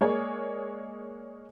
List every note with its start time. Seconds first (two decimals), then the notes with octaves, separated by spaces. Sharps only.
0.01 G#3 A#3 G#4 C#5 D5 G#5